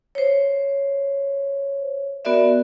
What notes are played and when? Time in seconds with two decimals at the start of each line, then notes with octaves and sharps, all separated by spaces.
0.15 C5 C#5
2.25 B3 F#4 A#4 D5 E5